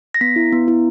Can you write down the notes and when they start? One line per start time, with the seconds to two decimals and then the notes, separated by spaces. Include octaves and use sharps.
0.15 A#6
0.21 B3 B6
0.36 E4
0.52 B3
0.68 E4